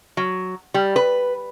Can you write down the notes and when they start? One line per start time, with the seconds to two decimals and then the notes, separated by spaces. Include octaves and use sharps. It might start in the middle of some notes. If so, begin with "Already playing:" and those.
0.17 F#3
0.74 G3
0.96 B4